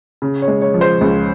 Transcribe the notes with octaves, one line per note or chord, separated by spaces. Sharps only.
C#3
C#5
G#3
C#5
F3
C5
C#2